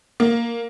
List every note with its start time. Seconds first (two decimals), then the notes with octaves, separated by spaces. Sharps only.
0.20 A#3